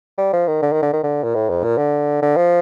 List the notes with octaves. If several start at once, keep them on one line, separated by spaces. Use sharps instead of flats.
G3
F3
D#3
D3
D#3
D3
D#3
D3
A#2
A2
F2
A#2
D3
D3
F3